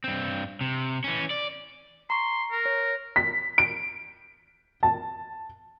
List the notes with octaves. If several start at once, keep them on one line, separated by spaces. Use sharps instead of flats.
G2 C4
C3
E3 C#4
D5
A#5 C6 C#6
A#4
C#5
B6
D7
A5